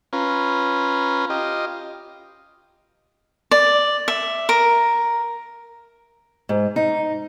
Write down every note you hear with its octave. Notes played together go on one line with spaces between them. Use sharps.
C#4 F4 B4 A#5
F4 G4 D#5
D5
E5
A#4
G#2
D#4